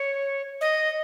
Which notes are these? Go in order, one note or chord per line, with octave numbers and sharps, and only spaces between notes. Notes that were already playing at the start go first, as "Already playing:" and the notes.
Already playing: C#5
D#5